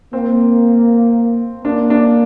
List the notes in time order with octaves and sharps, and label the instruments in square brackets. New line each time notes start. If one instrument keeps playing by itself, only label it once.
[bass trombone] A#3 [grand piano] C4
[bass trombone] A#3 [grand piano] D4
[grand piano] D4